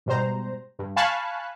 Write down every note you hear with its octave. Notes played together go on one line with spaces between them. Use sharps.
G#2 B2 G3 C5 A#5
G2
F5 G#5 A5 B5 C#6 F#6